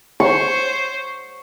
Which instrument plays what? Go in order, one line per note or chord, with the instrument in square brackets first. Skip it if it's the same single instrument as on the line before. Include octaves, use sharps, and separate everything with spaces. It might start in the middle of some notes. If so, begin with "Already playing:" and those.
[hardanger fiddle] C5 C#5 [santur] C#6